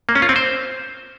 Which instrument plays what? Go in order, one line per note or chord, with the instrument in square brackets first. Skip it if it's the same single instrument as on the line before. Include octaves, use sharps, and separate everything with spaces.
[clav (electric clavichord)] A#3
C#4
F4
C4
C5